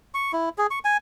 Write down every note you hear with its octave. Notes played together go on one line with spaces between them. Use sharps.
C#6
E4
G#4
C#6
G#5